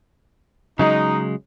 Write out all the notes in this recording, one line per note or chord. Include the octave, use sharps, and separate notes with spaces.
C#3 F#3 G#3 D#4